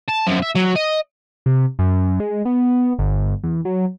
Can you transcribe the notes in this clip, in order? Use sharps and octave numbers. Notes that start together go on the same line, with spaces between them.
A5
F#2 F3
E5
F#3
D#5
C3
F#2
G#3
B3
G1
E2
F#3